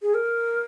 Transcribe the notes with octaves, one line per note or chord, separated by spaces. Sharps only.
G#4
A#4